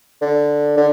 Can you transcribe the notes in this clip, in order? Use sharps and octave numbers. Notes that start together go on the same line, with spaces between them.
D3
D3